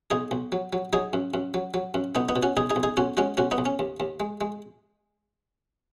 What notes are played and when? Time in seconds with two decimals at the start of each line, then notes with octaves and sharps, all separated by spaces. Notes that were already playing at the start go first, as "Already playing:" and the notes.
0.10 B1 D#4 G#4
0.31 B1
0.52 F#3
0.73 F#3
0.93 F#3 D#4 G#4
1.13 F#2
1.34 F#2
1.54 F#3
1.74 F#3
1.94 F#2
2.15 B1 B3 D#4
2.29 B3 D#4
2.36 B2
2.43 C#4 F#4
2.57 B1 D#4 G#4
2.70 D#4 G#4
2.76 B1
2.83 D#4 G#4
2.97 B1 C#4 F#4
3.17 G#3 C#4 F#4
3.37 B1 C#4 F#4
3.51 B3 D#4
3.58 B1
3.66 C#4
3.79 D#2
4.00 D#2
4.20 G#3
4.41 G#3